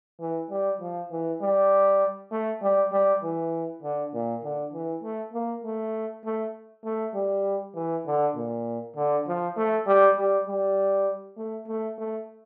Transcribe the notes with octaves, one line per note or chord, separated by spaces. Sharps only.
E3
G3
F3
E3
G3
A3
G3
G3
E3
D3
A#2
D3
E3
A3
A#3
A3
A3
A3
G3
E3
D3
A#2
D3
F3
A3
G3
G3
G3
A3
A3
A3